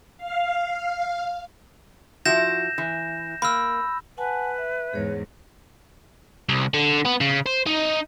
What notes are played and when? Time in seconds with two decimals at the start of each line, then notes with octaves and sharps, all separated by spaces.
0.18 F5
2.26 F3 E4 F#4 G6 A#6 E7
2.78 E3
3.42 A#3 B5 E6
4.18 B4 F#5 G#5 A5
4.58 E5
4.93 E2 G#2 G#4 C#5
6.49 C2
6.74 D3
7.05 B3
7.21 C#3
7.46 C5
7.66 D#4